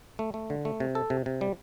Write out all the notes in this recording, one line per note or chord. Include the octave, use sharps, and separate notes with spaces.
A3
A3
D3
A3
C3
A4
C3
C3
G3